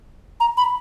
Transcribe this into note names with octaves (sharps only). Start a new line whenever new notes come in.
A#5
B5